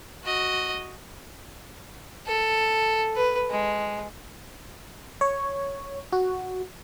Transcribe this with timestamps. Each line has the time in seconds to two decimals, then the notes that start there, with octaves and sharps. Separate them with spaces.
0.24 F#4 D#5
2.27 A4
3.16 B4
3.50 G#3
5.21 C#5
6.13 F#4